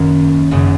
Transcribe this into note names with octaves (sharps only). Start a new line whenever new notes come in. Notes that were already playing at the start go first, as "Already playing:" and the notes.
Already playing: F#2 D#3 A#3 C#4
G#1 F#2 C#3